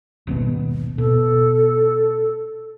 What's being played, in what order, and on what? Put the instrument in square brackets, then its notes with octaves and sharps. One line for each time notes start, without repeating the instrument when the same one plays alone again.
[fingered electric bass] D#1 G#1 B2
[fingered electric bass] B2 [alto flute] A4